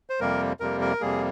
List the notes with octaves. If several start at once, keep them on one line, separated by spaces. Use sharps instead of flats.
C5
F2 C3 G3 A#3 A#4
F2 C3 G3 A#3 A#4
A#4
F2 C3 G3 A#3 G#4